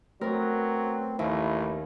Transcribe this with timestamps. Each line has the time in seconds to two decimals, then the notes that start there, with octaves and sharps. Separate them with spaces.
0.21 F#3 A3 B3 C4 A#4
1.19 A1 D#2 E4